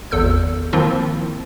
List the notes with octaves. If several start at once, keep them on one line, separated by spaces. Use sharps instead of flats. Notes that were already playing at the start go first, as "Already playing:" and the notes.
G#1 E2 A4 E6 G6
D#3 F3 A#3 C4 E4 F4